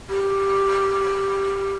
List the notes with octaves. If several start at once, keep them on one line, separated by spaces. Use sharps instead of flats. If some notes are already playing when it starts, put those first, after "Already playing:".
G4